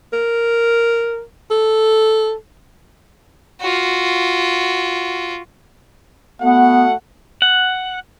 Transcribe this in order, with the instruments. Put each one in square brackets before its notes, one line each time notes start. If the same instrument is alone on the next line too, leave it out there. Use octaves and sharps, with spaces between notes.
[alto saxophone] A#4
A4
[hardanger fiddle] F4 F#4
[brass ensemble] A3 F#4 F#5 [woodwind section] B3
[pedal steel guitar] F#5